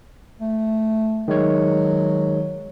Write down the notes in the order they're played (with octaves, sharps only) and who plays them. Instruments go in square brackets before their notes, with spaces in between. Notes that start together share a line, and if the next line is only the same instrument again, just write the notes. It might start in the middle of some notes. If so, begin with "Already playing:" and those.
[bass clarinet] A3
[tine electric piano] D#3 G#3 C#5 [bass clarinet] F#3